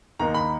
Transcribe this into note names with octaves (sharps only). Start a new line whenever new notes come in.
D#2 D#3 A#3 D#4 A#5
B5